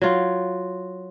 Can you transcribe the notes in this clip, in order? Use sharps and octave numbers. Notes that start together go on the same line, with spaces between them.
F#3 F4